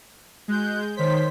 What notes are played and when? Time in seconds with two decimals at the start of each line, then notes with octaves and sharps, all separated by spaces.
0.48 G#3 F#4 F#6 G6
0.97 D#3 C5 C#5 C6 B6